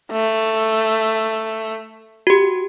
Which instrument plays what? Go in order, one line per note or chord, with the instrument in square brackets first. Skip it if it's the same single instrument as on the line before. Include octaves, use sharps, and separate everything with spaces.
[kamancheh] A3
[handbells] F#4 G4